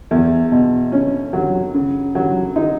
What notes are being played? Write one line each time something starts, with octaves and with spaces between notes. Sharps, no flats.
E2
B2
C#4
F#3
C#3
F#3
D#4